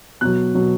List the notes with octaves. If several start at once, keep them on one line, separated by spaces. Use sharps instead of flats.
B2 F#3 F#6
B2 F#3